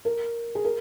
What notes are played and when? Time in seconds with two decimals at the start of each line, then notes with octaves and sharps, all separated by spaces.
0.05 A#4
0.55 G#4
0.65 A#4